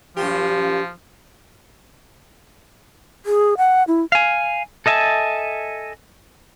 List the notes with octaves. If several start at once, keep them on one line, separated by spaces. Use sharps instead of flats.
F#2 A#2 F3 G4
G#4
F#5
E4
F5 G#5
A4 D#5 E5 G#5 A5